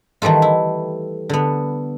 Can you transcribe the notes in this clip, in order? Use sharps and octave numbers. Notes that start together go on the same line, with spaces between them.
D#3 E3 G3 A3 F4
E4
D3 B3